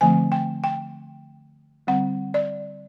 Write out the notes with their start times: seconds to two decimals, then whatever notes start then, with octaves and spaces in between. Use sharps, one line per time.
0.01 D3 F3 A3 C4 G#5
0.32 G5
0.64 G5
1.87 D3 G3 C4 F#5
2.34 D5